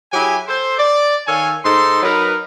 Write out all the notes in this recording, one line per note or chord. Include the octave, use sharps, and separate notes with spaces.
F#3 E4 G4 G#4 G#5
A4 C5
D5
D#3 A4 C#5 F5 G#5
G#2 D#4 A4 C6
F#3 D#4 A#4 B4